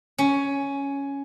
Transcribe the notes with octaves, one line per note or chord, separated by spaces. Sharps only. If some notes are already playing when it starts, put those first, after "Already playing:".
C#4